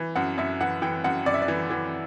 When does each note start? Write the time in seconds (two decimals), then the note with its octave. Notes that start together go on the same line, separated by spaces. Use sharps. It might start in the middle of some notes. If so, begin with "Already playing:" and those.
Already playing: E3
0.15 F#2 F#5
0.38 F#2 E5
0.61 E3 F#5
0.82 E3 G5
1.04 F#2 F#5
1.26 F#2 D5
1.34 E5
1.42 D5
1.48 E3
1.70 E3